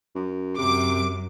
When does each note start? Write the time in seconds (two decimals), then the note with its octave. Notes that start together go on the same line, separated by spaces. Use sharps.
0.15 F#2
0.58 F#2 C3 D6